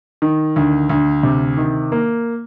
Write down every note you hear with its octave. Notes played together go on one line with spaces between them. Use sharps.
D#3
D2
D2
C3
D#3
A#3